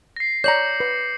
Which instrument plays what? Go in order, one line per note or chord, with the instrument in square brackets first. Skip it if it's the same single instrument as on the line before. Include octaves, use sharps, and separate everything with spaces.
[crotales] A#6 C7
[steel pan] C#5 D5 A#5 [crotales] D6 C#7 [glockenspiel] G6 F#7
[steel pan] B4